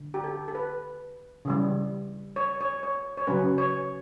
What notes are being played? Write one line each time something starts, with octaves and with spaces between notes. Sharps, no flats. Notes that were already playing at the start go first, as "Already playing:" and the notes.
Already playing: D3
G4
A4
A4
B4
C#3 E3 G3
C#5
C#5
C#5
C#5
C#3 F#3 C#4 B4
C#5